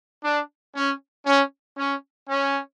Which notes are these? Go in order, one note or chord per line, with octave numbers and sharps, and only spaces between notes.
D4
C#4
C#4
C#4
C#4